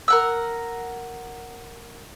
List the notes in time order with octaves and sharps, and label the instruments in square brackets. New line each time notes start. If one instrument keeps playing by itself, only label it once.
[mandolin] A#4 F#5 E6